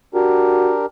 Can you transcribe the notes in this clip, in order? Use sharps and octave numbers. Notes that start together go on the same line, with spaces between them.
D4 F#4 G4 A#4